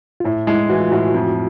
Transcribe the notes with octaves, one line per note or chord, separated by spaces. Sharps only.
F4
A2 E4
G#3 E4
E3 F#4
F4
A2 F#4
F2